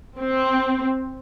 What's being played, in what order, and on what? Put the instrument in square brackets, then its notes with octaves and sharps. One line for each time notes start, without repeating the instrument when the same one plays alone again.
[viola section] C4